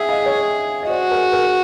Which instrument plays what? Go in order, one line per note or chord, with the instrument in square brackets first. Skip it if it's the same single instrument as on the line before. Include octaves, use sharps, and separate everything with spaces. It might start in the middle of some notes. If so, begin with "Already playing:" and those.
Already playing: [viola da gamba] G#4 [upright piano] E5 F#5 G5
[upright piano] D#5 F5
C#5 D#5
D#5
[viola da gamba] F#4 [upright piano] C5 D5
[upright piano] G#4 A#4
G#4 A#4